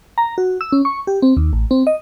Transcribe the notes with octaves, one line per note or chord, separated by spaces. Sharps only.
A#5
F#4
E6
C#4
C#6
G4
C4
D#2
A1
C4
D#5